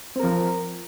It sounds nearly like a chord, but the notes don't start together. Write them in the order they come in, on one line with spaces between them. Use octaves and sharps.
C4 A#4 F3